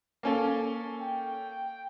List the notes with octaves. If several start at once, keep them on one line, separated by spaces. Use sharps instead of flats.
A#3 C#4 A4
G5